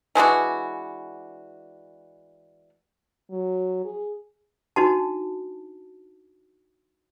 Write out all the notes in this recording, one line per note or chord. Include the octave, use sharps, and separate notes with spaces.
E3 G#3 D4 F#4
F#3
G#4
D4 D#4 F#4 A5